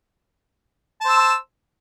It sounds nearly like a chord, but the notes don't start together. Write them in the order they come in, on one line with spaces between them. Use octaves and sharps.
A5 C5 E6